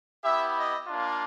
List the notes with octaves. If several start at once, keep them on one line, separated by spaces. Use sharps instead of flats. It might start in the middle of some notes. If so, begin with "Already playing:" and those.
B3 E4 G4 E5
D#5
A#3 D4 F4